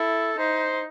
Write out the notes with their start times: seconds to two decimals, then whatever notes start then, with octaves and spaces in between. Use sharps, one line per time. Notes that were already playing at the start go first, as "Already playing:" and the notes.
Already playing: E4 A4
0.37 D#4 C5